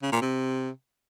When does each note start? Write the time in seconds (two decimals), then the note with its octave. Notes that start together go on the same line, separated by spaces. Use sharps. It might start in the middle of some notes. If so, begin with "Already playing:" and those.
0.02 C#3
0.12 A#2
0.22 C3